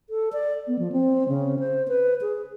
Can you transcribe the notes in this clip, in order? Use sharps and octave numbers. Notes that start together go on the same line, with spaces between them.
A4
D5
B3
F3
C4
C#3
C5
B4
G#4